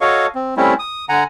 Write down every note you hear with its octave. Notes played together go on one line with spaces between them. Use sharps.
F#4 A4 C#5 D#5 F5 C#6
C4
G3 A3 C4 C#4 E4
D#6
D3 F#5 G#5 A#5